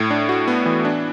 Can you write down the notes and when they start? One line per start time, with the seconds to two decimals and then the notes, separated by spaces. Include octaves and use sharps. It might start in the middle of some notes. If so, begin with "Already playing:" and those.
Already playing: A2
0.10 D4
0.29 F#4
0.47 B3
0.66 E3
0.85 D4